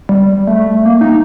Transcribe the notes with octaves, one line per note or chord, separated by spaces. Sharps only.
G3
A3
A#3
D#4